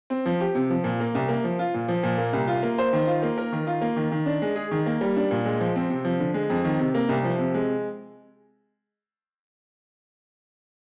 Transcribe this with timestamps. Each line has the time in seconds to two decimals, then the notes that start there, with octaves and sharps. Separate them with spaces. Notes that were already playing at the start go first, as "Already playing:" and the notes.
0.10 C4
0.26 F3
0.40 G4
0.55 C3
0.70 F3
0.84 A#2
1.00 A#3
1.15 C2
1.29 A#3
1.44 F3
1.59 F4
1.74 A#2
1.88 F3
2.03 A#2
2.18 A#3
2.33 C2
2.48 F4
2.63 A#3
2.78 C5
2.93 D#3
3.07 F4
3.23 A#3
3.38 A#4
3.52 D#3
3.67 F4
3.81 A#3
3.96 D#3
4.12 D#3
4.26 D4
4.42 G#3
4.56 G#4
4.71 D#3
4.86 A#3
5.01 G3
5.16 D4
5.31 A#2
5.45 G#3
5.60 F3
5.76 C4
5.90 C3
6.05 F3
6.20 D3
6.34 G#3
6.50 F2
6.64 D#3
6.79 C3
6.94 A#3
7.09 C2
7.24 F3
7.38 C3
7.54 G#3